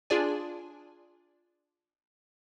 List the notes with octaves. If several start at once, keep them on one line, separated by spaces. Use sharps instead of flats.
D4 F4 G#4 D5 G#5